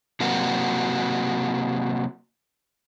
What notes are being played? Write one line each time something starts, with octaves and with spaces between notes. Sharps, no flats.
C3 F#3 A#3 F#4